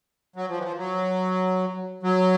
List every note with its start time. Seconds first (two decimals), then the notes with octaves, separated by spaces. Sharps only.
0.36 F#3
0.49 F3
0.58 E3
0.63 F3
0.77 F#3
2.03 F#3